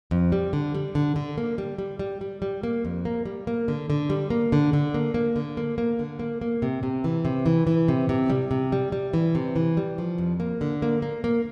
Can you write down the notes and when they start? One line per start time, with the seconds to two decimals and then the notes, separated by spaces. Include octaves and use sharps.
0.11 F2
0.32 G3
0.53 D3
0.75 G3
0.95 D3
1.16 D3
1.38 A#3
1.58 G3
1.78 G3
1.99 G3
2.21 G3
2.42 G3
2.63 A#3
2.85 F2
3.05 A#3
3.26 G3
3.47 A#3
3.68 D3
3.90 D3
4.10 G3
4.30 A#3
4.52 D3
4.73 D3
4.94 A#3
5.14 A#3
5.36 D3
5.57 A#3
5.78 A#3
5.99 D3
6.19 A#3
6.41 A#3
6.62 C3
6.83 C3
7.04 E3
7.25 C3
7.46 E3
7.67 E3
7.88 C3
8.09 C3
8.30 G3
8.51 C3
8.72 G3
8.92 G3
9.14 E3
9.35 C3
9.56 E3
9.77 G3
9.98 F3
10.18 F2
10.40 A#3
10.61 D3
10.82 A#3
11.02 A#3
11.24 A#3